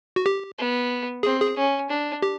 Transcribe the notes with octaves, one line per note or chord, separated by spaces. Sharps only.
F#4
G4
B3
C4 G#4
G#4
C#4
D4
G4